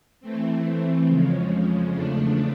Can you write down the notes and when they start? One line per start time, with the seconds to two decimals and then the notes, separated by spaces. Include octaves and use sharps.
0.21 E3 A3 C4
1.06 F2 C#3 F3 G#3 C#4
1.91 E2 C#3 F3 A3 D4